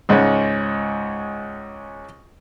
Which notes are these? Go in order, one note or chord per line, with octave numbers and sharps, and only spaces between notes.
C#2 G#2 G#3 C#4